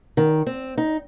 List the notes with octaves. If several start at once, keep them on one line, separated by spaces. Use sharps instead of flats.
D#3
C4
D#4